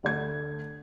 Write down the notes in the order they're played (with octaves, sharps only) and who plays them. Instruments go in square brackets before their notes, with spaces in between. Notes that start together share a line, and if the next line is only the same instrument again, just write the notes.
[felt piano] D2 D3 G#6